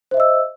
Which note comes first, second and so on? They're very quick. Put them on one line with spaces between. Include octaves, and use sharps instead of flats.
C5 E5 D#5 E6